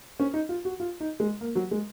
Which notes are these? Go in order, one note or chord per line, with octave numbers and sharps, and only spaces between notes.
C#4
D#4
F4
F#4
F4
D#4
G#3
A#3
F#3
G#3